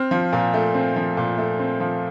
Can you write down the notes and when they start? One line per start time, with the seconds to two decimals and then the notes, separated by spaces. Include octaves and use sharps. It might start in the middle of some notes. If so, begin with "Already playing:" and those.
Already playing: C4 F6
0.11 F3
0.33 A#2
0.54 A3
0.75 C4
0.96 F3
1.17 A#2
1.38 A3
1.59 C4
1.80 F3